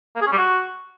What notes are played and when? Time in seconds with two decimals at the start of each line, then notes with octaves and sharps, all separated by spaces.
0.15 A#3
0.21 G#4
0.26 C#4
0.32 G3
0.38 F#4